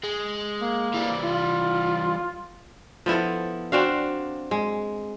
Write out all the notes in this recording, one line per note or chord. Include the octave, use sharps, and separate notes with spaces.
G#3
A#3
E3 G3
F4
F3 B3 E4 A4
C4 D4 F#4 F5
G#3